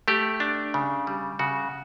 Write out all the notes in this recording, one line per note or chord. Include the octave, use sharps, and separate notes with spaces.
A3 G4
D4
C#3
G3
C#3 F#4